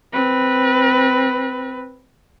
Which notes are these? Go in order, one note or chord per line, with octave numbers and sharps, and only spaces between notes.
C4 B4